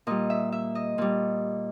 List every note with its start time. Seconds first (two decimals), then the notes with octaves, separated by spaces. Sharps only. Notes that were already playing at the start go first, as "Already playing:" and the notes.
0.07 A#2 G3 D#5
0.30 E5
0.52 E5
0.75 D#5
0.98 A#2 G3